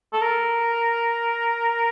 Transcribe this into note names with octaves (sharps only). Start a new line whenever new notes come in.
A4
A#4